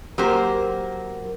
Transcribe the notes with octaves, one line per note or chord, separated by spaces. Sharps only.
F#3 A#3 G4 A#4 C5